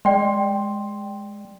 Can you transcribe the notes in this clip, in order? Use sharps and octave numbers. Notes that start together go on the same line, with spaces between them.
G#3 D5 G5 C6